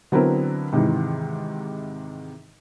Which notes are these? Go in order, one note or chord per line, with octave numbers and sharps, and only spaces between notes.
D3 F#3 B3 C4 E4 A#4
G#2 C3 D#3 E3